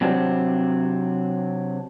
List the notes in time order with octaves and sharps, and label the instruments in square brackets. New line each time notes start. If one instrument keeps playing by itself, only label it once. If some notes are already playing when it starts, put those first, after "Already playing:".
[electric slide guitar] C3 F#3 C4 D4